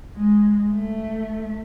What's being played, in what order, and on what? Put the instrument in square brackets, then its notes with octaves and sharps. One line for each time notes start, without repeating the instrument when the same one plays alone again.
[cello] G#3
A3